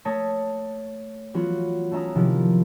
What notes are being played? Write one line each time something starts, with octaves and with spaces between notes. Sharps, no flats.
A3 C#5 A5 D#6 A#6 B6
E3 F#3 B3 F4 F#4
A3 C#4 E5 A#5 D#6
C3 D#3 F3 E4